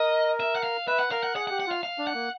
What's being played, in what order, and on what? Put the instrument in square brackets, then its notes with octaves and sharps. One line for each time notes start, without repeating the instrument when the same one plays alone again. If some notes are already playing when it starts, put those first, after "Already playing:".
Already playing: [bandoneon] A#4 [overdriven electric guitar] D#5
[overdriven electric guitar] E5
F#5
F5
[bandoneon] B4 [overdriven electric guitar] E5
[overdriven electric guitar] F#5
[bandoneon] A#4 [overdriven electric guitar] F5
[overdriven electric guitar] F#5
[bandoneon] G#4 [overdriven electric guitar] F#5
[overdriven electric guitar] F#5
[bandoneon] G4
[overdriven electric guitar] F#5
[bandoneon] F4 [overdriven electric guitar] F5
[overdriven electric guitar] F5
[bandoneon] D4
[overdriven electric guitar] F#5
[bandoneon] A#3